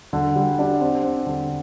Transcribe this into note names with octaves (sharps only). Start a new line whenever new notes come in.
D3
G3
D4
C4
C4
D3